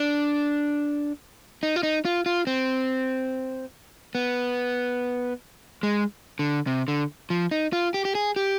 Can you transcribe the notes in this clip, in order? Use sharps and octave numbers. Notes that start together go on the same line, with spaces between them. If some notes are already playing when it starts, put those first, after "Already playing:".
Already playing: D4
D#4
F4
D#4
F4
F4
C4
B3
G#3
D3
C3
D3
F3
D#4
F4
G4
G4
G#4
G4